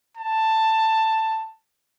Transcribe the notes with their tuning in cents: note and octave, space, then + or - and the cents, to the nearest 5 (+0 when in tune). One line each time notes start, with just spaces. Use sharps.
A5 +10